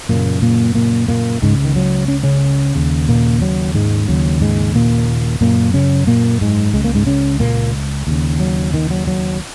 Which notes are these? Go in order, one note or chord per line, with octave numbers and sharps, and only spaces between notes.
F#2 A#2 C#3 A#3
A#2 A#3
A#2 A#3
A#2 A#3
C#2 G#2 C#3 G#3
D#3
F#3
C#4
C#3 C#4
D#2 C#3
A#2 A#3
F#3
G#2 G#3
D#2 C#3 F#3
G#2 G#3
A#2 A#3
F#2 A#2 C#3 A#3
C#3 C#4
A#2 A#3
G#2 G#3
C#2 C#3 G#3
A#3
G#2 G#3
C#3 C#4
A#2 A#3
D#2 C#3
F#3
D#3
F#3
F#3